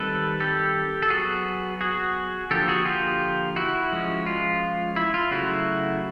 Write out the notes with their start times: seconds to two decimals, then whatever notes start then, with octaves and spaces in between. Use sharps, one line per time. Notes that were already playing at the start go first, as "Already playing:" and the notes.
Already playing: D#3 G3 C4 A4 B4
0.40 G4 A4
1.03 A4
1.10 F#3 B3 F#4 G#4
1.81 F#4 G#4
2.51 D3 F3 A#3 G4 A4
2.68 F#4 G#4
2.85 F4 G4
3.56 E4 F#4
3.92 F3 G#3 C#4
4.26 F4
4.96 E4
5.14 F4
5.31 C#3 F#3 A3 E4 F#4